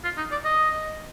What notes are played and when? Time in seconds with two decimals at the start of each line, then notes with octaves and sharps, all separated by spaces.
0.04 F4
0.17 D#4
0.32 D5
0.45 D#5